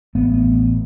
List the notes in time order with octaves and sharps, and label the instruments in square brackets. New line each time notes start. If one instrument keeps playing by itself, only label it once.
[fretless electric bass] A1 A3 B3